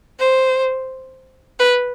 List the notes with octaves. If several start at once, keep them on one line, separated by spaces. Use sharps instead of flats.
C5
B4